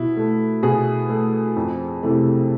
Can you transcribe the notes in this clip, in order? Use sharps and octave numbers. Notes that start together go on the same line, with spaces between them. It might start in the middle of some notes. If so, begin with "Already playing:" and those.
Already playing: B2 E4
A3
B2 G#4
A3
F2
C3 E3 A3